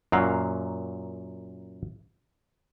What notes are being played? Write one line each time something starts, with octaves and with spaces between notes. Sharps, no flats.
F#2 A#2 F#3 F5